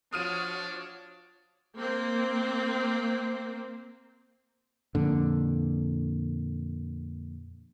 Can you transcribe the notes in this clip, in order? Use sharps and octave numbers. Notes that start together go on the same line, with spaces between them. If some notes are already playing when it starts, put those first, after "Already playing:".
F3 D4 F#4 C#5 D#6 F6 D#7
A#3 C4
F2 A#2 D3